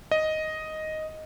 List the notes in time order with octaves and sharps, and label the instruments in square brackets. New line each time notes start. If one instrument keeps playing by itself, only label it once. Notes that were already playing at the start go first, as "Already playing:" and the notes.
[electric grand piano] D#5